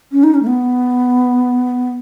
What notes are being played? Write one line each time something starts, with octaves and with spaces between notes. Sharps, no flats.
C#4
D#4
C#4
A3
B3